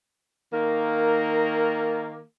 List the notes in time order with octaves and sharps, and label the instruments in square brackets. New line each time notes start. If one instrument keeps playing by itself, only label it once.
[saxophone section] D#3 A#3